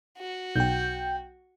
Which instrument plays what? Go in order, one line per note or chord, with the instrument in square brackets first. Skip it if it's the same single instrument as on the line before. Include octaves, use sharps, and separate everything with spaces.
[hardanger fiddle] F#4
[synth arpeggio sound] B1 [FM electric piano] G5 G6